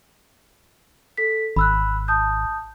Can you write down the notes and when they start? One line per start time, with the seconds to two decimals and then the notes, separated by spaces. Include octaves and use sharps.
1.17 A4 B6
1.56 G#1 B5 E6 F#6
2.08 A5 D#6 G6